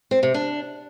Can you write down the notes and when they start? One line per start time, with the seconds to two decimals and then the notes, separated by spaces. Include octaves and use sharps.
0.11 C4
0.23 C3
0.34 D4